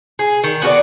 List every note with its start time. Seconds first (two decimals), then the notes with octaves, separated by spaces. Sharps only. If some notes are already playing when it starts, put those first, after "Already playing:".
0.19 G#4
0.44 D#3
0.62 B3 F#4 A#4 D5